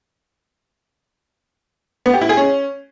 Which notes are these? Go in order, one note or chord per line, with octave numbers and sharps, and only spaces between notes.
B3
G4
E4
G#4
C#4